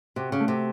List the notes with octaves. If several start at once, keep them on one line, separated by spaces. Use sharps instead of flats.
C3 F#4
C#3
A3
C3